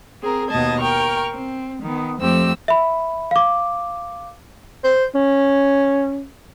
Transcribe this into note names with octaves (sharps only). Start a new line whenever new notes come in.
C4 G#4 A#4
D#2 B2 B3 D#5 A5 G#6
A#4 G5 C#6 F6
C4
D#3 B3
F2 F3 A3 C4 G4 E6
E5 B5
F5 D6
C5
C#4